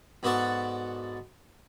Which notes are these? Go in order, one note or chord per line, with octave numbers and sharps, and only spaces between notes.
G#2 B3 F#4 A4 D5 C#6